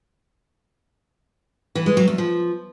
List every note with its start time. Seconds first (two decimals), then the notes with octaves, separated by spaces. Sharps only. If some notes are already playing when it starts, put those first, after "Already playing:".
1.75 E3
1.86 G#3
1.97 F#3
2.08 E2
2.18 F3